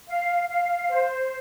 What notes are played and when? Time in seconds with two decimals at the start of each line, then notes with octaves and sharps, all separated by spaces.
0.08 F5
0.49 F5
0.89 C5